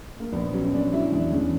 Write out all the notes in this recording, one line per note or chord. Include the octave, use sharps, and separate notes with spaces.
A#3
A#1 B3
F#3 C#4
C#4
A#1 D4
F#3 E4
E2 D4
E2 C#4